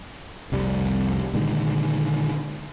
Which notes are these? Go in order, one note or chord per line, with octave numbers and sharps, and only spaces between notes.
F1 C2 G3
A#2 D3 D#3 G#3